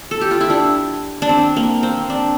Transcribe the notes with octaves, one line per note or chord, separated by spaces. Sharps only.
A4
G4
F4
E4
D4
D4
C4
A#3
C4
D4